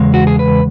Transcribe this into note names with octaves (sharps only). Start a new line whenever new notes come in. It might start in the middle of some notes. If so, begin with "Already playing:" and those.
Already playing: E2 C#3 G#3
F#4
G#4
B4